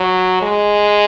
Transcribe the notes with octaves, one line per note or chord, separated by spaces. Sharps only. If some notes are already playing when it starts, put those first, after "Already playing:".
Already playing: F#3
G#3